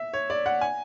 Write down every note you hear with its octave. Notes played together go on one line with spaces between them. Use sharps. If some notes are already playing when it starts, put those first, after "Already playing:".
Already playing: E5
C#5
D5
F#5
G#5